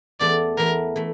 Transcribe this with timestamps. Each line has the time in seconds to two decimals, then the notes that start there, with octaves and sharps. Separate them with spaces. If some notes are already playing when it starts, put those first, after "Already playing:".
0.20 E2 E3 A3 D5
0.57 E2 E3 A3 A#4
0.96 E3 A3